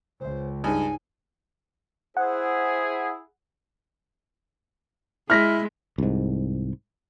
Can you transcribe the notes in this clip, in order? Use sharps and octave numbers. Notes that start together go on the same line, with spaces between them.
C#2 C5
G2 G#3 D#4 G#5
E4 G#4 C5 F#5
G#3 E4 F6 A#6 B6
C2 G#2